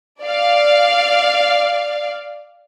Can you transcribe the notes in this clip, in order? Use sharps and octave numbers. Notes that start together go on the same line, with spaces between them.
D5 F5